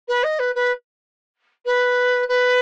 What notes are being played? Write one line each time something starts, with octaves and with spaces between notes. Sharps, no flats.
B4
D#5
B4
B4
B4
B4